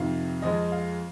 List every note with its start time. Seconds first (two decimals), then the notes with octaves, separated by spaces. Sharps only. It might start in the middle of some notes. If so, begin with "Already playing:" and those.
Already playing: F2 C3 D#3 F5
0.42 F2 F3 G#3 D#5
0.72 F5